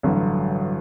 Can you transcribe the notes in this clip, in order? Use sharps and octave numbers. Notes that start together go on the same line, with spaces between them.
A1 G2 D3 F#3